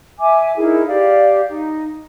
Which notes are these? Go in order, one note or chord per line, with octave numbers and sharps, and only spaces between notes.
E5 G#5 D6
D#4 E4 G#4 A#4
G4 D5 F5
D#4